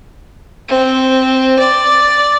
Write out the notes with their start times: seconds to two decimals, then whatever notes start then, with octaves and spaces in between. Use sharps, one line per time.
0.69 C4
1.59 D5